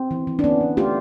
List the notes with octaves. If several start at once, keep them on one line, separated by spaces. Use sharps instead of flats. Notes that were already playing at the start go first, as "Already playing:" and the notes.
Already playing: C4
E3
E3
D4
E3 B3 C#4
E3
A3 F4 G4